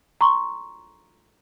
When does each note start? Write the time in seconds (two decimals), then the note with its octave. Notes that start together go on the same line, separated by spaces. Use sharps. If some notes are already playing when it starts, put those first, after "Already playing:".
0.21 A#5 C6 C#6